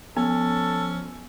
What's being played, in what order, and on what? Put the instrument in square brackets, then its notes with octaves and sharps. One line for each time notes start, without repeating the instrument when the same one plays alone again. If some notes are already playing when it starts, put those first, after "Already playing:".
[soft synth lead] F3 [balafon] B3 [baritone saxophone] C#4 [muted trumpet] A4